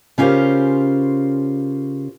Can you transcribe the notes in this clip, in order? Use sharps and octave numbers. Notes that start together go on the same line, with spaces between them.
C#3 C#4 F4 G4 A#4 C5